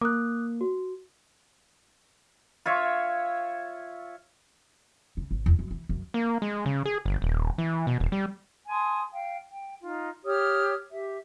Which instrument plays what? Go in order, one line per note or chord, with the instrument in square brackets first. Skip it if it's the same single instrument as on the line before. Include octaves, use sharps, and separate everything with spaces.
[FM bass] A#3 [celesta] D6 D#6 F#6
[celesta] F#4
[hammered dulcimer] F4 C#5 E5
[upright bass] C#3
G#1
E2
F#2
E3
F#2
[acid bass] A#3
G#3
C#3
G#4
G1
D#1
E3
B2
D#1
G3
[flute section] G#5 A5 C6 D#6
F5 G5
G5
D#4 F4
G4 C#5 D#6 F6
G4 E5